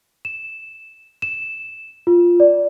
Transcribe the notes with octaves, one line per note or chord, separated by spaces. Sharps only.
E7
E7
F4
D5